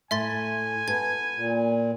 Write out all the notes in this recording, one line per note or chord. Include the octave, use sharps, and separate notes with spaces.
A2 E5 G#5 C6 A6
B3 B4 A5 G#6
A#2